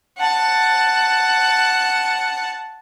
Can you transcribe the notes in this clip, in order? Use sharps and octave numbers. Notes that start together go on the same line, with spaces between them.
F#5 A5